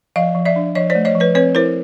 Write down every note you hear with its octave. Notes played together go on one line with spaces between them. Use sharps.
F3 D#5 F5
F3
D5 E5
D4
F3 C#5 D#5
C5 D5
A3
C#5 D#5
F3
B4 C#5
C4 B4 C#5
E4 A#4 C5